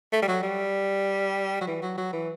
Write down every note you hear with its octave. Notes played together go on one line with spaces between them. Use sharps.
A3
G3
F#3
G3
F#3
E3
F#3
F#3
E3